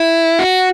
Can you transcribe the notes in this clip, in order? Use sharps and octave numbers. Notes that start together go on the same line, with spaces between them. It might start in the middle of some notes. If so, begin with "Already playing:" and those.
Already playing: E4
F#4